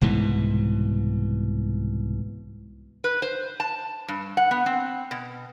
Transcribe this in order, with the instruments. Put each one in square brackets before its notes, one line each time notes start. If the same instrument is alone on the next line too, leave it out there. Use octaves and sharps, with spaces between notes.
[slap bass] C2 G#2 B2 E3
[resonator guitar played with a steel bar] B4
C5
A5
G2
F#5
B3
C4
B2